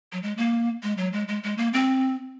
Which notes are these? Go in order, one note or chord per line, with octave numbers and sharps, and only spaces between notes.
F#3
G#3
A#3
G#3
F#3
G#3
G#3
G#3
A#3
C4